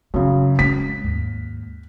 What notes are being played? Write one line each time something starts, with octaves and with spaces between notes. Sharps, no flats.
F#2 C#3 A3
G#3 C#4 B6
D#2 G#2